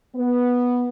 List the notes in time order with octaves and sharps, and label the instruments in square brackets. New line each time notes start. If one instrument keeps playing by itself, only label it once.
[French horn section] B3